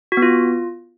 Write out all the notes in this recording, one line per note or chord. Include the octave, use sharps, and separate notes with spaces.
F#4
B3
F4